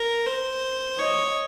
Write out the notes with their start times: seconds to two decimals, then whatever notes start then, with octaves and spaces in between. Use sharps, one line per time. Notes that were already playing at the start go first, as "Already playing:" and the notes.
Already playing: A#4
0.27 C5
0.98 C#5 D#5